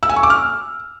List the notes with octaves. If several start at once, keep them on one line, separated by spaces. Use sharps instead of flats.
E6
G#5
C#6
D6
F6